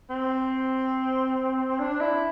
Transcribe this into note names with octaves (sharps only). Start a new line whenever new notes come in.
C4
D4
E4